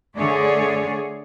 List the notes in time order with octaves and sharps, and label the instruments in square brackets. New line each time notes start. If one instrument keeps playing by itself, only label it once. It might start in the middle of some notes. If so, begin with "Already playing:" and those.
[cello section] D3 A3 G#4 C#5 D5